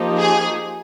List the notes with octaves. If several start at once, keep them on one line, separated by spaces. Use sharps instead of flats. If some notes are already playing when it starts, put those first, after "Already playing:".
Already playing: F3 A#3 D#4 G4
G#4